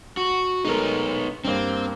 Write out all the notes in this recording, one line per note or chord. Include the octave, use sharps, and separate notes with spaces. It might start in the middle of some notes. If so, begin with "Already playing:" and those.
F#4
G#3 A3 B3 D#4 A#4
G2 A#3 C4